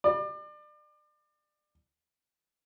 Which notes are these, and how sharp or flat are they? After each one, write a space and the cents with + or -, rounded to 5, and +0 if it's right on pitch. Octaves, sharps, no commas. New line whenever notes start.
D5 +35